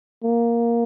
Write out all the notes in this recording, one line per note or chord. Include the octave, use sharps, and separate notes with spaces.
A#3